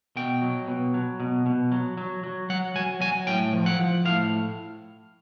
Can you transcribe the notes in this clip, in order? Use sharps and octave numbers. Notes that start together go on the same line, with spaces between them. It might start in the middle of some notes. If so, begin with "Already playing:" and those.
B2 G5
F#3
B2
F#3
B2
B2
F#3
F#3
F#3
F#3 F#5
F#3 G#5
F#3 G#5
A2 G5
F3
F#5
F3
A2 F5